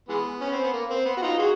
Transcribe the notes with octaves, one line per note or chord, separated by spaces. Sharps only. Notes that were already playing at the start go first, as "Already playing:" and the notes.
E3 G#3 B3
C#4
C4
B3
A#3
C4
B3
F#4
D#4 F4
F#4 G#4